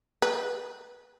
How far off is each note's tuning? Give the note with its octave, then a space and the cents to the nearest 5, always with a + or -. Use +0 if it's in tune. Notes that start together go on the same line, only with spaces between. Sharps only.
B4 -15